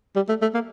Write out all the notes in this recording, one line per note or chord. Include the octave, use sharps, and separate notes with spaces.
G3
A3
A3
A#3